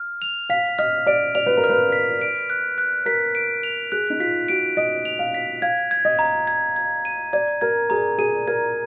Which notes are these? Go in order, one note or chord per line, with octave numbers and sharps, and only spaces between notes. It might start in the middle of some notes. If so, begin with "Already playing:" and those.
Already playing: F6
F7
F5 B6
D#5 F6
D5 D7
D5 F7
B4
A#4
F6
B4
B6
D7
F#6
F#6
A#4 B6
D7
F7
G#4 F#6
D#4
F4 B6
F#4 D7
D#5 D7
F7
F5
B6
F5 G#6
G#6
D#5
A#5
G#6
G#6
D#7
D5 G#6
A#4 G#6
G#4 A#5
G#4 D#7
A#4 G#6